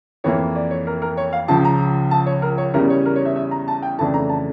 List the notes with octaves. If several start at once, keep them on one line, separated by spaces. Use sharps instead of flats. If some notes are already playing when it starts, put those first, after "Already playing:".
F2 E3 A#3 C#5
D5
C#5
A#4
A#4
C#5
F5
C#2 C#3 F3 A5
A#5
A5
C#5
A#4
C#5
E2 C#3 G3 C#4 A#4
C#5
A#4
C#5
E5
E5
A#5
A5
G5
F2 C#3 E3 A3 D4 A5
A#5
A5